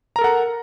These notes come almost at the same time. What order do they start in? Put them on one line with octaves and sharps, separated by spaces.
A#5 A#4 A4 F#5